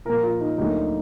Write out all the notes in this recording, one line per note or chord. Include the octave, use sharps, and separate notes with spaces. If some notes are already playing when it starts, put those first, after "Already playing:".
A#2 F3 A#3 A#4
F4
D#4
D2 D3 F#3 A#3 D#4